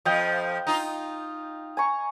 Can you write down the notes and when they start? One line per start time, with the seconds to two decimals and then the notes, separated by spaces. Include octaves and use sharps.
0.05 F2 F3 D#5 F5 G5
0.67 D#4 F4
1.77 G#5 A#5 C#6